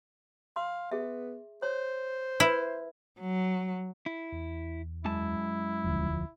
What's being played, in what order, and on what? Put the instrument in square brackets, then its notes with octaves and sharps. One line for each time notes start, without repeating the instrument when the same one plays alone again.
[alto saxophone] F5 [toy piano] C6
[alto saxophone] B3 [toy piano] G#4 E5
[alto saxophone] C5 [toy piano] C#5
[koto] E4 [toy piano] A#4 B4
[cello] F#3
[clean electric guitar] E4
[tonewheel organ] E2
[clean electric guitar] F#2 G#3 A5 [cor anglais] E4
[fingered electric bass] E1 D2 [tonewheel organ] F3